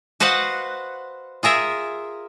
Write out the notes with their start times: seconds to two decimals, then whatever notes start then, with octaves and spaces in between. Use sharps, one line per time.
0.20 F#4 B4 C5 D#5 F5 F#5
1.43 F4 G#4 A#4 E5